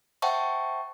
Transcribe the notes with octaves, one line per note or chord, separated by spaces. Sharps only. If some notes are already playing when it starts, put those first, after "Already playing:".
C5 E5 F#5 G5 A5 C#6